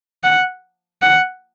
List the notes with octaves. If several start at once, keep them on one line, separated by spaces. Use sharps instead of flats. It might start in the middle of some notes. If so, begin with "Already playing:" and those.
F#5
F#5